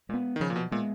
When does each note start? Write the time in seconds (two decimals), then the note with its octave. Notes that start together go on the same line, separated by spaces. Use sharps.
0.09 A#2 G#3
0.14 B3
0.36 D#3
0.40 C#3 F3
0.50 A#2
0.56 B2
0.71 A#2 G#3 B3